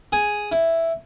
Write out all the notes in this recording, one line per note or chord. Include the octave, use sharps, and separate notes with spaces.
G#4 G#5
E4